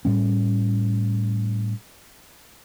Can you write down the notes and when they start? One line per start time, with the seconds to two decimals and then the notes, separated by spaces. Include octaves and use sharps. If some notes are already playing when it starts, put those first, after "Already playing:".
0.05 A2 G3 C#4